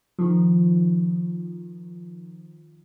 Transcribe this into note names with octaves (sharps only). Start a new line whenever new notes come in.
D#3 F3